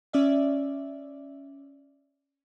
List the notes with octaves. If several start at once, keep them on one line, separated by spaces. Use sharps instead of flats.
C#4 D5 E5